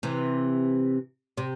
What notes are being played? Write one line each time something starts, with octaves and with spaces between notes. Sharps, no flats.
C3 E3
C3